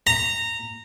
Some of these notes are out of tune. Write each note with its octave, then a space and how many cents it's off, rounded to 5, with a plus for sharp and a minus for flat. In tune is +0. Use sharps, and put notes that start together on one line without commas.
A#5 -15